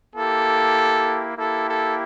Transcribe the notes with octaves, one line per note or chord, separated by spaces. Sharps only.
A#3 E4 G4 A4
A#3 E4 G4 A4
A4